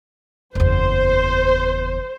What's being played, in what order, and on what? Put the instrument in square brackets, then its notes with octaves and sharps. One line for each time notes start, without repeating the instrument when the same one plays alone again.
[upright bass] F#1 E2 [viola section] C5